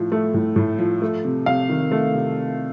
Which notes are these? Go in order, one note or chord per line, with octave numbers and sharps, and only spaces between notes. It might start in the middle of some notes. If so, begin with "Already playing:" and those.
Already playing: A2 F3
A3
A2
A2
F3
A3
C3
C3 F5
D#3
A3
C3